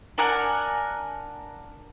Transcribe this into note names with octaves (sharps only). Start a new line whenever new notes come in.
D4 A#4 F#5 G#5